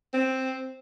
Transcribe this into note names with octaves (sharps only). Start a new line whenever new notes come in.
C4